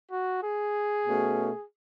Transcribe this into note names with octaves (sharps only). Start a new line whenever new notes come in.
F#4
G#4
B2 A3 C#4